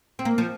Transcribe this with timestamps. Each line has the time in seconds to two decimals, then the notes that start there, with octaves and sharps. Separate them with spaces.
0.19 C4
0.25 A#3
0.38 F3